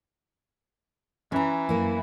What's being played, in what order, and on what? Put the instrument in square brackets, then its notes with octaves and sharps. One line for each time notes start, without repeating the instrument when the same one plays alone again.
[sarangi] E3 [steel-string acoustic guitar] C#4 A#5
[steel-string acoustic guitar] F#2 A#3 E4